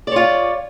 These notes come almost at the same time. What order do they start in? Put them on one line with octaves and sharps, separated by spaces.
D5 C#5 F4